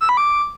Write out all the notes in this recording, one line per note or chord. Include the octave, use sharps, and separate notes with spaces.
E6
B5
D6